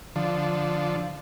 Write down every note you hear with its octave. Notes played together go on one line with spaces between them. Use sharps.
D3 F3